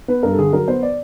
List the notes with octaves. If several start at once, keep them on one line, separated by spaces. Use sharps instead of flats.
B3 B4
G2 A#4
A4
D3 G#4
F#3 A#4
B3 C5
D5